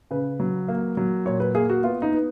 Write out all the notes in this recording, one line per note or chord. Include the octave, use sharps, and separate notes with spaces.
C#3 B4
F#3
A#3
F#3
A#2 C#5
B4
A#3 G#4
F#4
B3 F4
D#4
B3